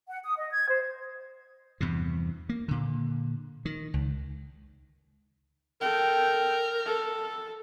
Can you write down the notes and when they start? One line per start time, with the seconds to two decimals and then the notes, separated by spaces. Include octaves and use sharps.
0.10 F#5
0.24 D#6
0.38 D#5
0.51 G#6
0.69 C5
1.81 E2 G2 C3
2.49 A#3
2.68 A#2 D3
3.65 D#3
3.94 C#2
5.81 A4 A#4 G5
6.85 A4